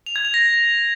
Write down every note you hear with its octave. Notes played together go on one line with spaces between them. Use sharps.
F7
G#6
F7
A#6